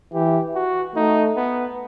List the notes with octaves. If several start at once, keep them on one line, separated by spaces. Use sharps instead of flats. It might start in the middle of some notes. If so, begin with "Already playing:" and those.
E3 G4
F#4
A3 D#4
B3